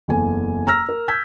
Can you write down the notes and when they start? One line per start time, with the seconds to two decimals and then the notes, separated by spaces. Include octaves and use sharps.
0.08 F#1 E2 A4 G#5
0.67 A#5 E6 F6 A#6
0.89 A#4
1.08 E6 G6 G#6 B6